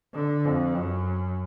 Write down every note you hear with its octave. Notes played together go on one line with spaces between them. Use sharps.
D3
F2
F#2